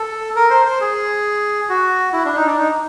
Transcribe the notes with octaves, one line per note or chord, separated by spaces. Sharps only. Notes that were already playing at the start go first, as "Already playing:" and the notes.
Already playing: A4
A#4
C5
C5
G#4
F#4
E4
D4
D#4
D4
D#4